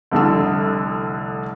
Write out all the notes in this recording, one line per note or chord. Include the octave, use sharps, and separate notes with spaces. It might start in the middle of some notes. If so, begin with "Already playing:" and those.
F1 C2 D3 E6